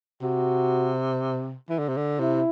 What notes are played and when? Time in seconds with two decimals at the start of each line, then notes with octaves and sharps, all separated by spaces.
0.22 C3 F#4
1.70 E3
1.79 D3
1.88 C3
1.97 D3
2.19 C3 E4